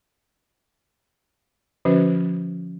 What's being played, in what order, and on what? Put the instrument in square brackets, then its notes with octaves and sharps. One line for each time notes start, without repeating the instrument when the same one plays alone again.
[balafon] D3 F3 C#4 F#4 B4 C5